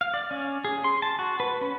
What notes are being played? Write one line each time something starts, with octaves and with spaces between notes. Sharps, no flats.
F5
D5
C#4
G#4
C6
A5
F#4
B4
C#4